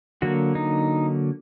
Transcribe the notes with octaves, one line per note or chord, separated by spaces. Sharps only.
D3 F#3 A#3 F#4
D#4